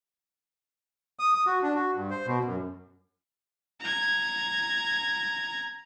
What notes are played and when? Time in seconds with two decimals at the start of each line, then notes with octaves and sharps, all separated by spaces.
1.19 D#6
1.34 D#6
1.46 F#4
1.62 D4
1.75 F#4
1.94 G2
2.10 C5
2.27 B2
2.44 F#2
3.80 A#5 G#6